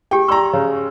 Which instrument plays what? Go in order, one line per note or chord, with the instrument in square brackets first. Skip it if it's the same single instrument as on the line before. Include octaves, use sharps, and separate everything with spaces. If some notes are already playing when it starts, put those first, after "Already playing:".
[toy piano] G4 G#4 [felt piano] G5
[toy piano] D5 C6 C#6 [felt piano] A#5 E6
[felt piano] C#3 [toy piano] C#5